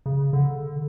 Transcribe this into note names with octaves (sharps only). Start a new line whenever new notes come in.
C#3
D3